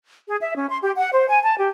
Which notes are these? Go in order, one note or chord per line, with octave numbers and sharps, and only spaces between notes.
G#4
E5
C#4
C6
G4
F#5
C5
G#5
A5
G4